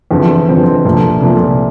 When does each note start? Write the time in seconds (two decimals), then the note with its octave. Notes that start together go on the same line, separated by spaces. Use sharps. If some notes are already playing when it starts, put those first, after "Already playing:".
0.11 E2 D3 F3 C4
0.49 E2 D3 F3 C4
0.85 C2 A#2 F3 A3
1.22 C2 A#2 F3 A3